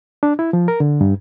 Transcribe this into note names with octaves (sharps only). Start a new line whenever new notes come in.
D4
E4
F3
A#4
D3
G2